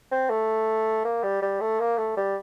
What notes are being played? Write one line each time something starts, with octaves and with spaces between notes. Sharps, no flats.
C4
A3
A#3
G3
G3
A3
A#3
A3
G3